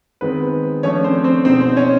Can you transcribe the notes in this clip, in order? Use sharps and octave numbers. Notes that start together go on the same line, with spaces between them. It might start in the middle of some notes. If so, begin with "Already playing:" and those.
D#3 G#3 B3 C4 B4
F3 A3 C#4 D4 C#5
C4 C5
C4 C5
B2 G#3 C4 D#4 C5
C4 C5
C#4 C#5